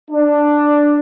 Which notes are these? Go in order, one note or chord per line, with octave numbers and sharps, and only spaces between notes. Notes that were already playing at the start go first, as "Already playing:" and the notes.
D4